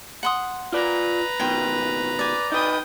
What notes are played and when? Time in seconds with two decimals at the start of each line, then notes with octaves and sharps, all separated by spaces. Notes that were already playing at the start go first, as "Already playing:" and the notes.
0.23 F#5 C6 D#6
0.72 F4 B4 D5 A#5
1.40 C#2 B2 D#3 G5 G#5 C6
2.19 D5 G#5
2.52 D#4 B4 G5 D#6